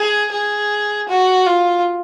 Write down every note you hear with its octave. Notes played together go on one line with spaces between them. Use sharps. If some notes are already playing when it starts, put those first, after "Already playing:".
Already playing: G#4
G#4
F#4
F4